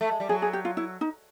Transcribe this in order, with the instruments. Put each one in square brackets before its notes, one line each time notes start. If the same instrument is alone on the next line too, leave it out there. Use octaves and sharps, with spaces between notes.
[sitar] A3
G#3
G3
[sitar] F#3 [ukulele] G#4
[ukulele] G#4
G4
F4
E4
D#4